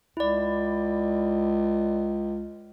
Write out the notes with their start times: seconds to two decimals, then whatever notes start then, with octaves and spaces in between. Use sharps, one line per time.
0.17 C#2 E4 D5